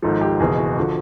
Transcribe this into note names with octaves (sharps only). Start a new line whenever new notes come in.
G#1 G#2 F3 A4
G4
F#1 E2 B2 G#4
F#4
D3 F3